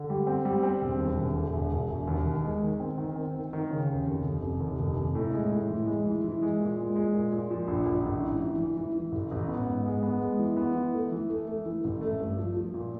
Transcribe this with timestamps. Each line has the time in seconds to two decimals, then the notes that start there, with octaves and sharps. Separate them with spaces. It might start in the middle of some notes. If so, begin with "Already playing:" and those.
Already playing: D3
0.10 G3
0.27 C4
0.45 G3
0.63 C4
0.81 E1
0.99 D#2
1.18 E1
1.35 D3
1.53 E1
1.72 E1
1.90 E1
2.07 D#2
2.25 D#3
2.44 G#3
2.62 D#3
2.80 C4
2.98 D#3
3.16 C4
3.34 D#3
3.53 D#3
3.70 C#3
3.88 D#2
4.07 F1
4.25 F1
4.42 F1
4.60 D#2
4.80 F1
4.96 F1
5.15 A2
5.33 G#3
5.52 A2
5.69 E3
5.87 G#3
6.05 E3
6.24 E3
6.42 G#3
6.60 A#2
6.78 G#3
6.96 G#3
7.14 A#2
7.33 A#2
7.51 F3
7.68 A#1
7.86 A#1
8.04 A1
8.23 E3
8.40 E3
8.58 E3
8.77 E3
8.94 E3
9.12 A1
9.31 A1
9.48 B3
9.67 G#2
9.85 G#3
10.03 B3
10.21 G#3
10.39 E3
10.57 B3
10.75 E3
10.94 A3
11.12 E3
11.29 A3
11.47 A3
11.66 E3
11.84 A1
12.01 A3
12.20 G2
12.38 F3
12.57 F3
12.74 A#2